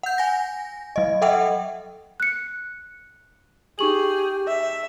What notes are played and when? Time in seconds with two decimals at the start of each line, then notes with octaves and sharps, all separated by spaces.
0.03 F#5 G6
0.18 G#5 A#6
0.96 F#3 D#5
1.22 A4 D#5 E5 F#5 G5
2.20 F#6 C#7
3.79 D#4 G4 G#4 C#6 F#7
4.47 E5